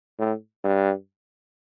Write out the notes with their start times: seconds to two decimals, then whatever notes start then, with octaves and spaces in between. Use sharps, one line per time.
0.19 A2
0.64 G2